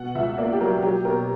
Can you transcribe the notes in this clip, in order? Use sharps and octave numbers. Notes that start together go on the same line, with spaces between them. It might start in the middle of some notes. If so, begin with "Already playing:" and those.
Already playing: B2 F#5
C#2 E5
A#3 D5
G4
F#3 A#4
F#3 G4
B2 A#4